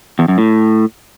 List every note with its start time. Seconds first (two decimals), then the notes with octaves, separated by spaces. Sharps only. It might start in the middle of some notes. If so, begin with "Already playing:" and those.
0.19 E2
0.28 F#2
0.38 A2